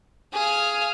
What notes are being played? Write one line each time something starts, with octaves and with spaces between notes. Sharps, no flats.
G#4 F5